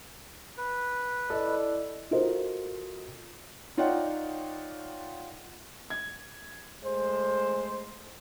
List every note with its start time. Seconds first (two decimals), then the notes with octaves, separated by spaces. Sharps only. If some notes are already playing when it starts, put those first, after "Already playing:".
0.57 B4
1.30 E4 A4 D5 D#5
2.11 F4 F#4 A4 A#4 C5 D#5
3.77 D#4 F4 C#5 D5 F#5 G5
5.90 G#6
6.84 G#3 A3 C5